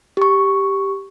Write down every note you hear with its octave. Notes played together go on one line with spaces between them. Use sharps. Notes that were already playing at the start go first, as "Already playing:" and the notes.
G4 C#6